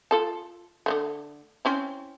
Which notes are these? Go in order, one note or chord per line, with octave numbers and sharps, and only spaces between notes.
F4 A4 A5
D3 F3 A3
C4 C#4 E4